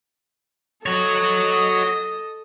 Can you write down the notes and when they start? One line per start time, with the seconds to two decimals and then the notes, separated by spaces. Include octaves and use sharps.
0.86 F#4 A4 C#5 D#5